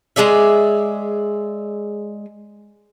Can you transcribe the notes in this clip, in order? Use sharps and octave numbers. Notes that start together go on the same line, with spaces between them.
G#3 G#4 D5 E5